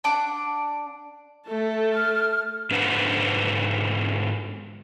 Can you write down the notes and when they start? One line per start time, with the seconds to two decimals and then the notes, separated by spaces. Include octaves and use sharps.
0.04 D4 F#5 D6
1.46 A3 A4
1.92 F6
2.71 G#2 D3 D4 B4 C5 F#5